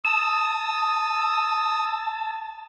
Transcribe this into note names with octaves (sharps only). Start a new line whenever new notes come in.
A5 D#6 E6